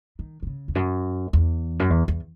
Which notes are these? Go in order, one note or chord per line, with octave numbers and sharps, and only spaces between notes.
D#3
D#3
C#3
E2
F#2
E2
F#2
E2
E2